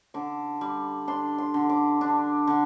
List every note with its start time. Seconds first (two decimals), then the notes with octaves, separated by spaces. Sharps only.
0.14 D3 D6
0.61 G3
1.08 D4 C6
1.38 C6
1.54 D3
1.69 D6
2.01 D4
2.47 D3